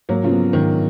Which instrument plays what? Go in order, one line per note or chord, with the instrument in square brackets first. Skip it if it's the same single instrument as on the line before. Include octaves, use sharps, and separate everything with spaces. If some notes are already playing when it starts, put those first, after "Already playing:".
[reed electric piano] G#2 [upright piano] F#3 A#3
[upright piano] C#3 F3
[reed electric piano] F#3 B3
[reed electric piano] G#2 [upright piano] D#3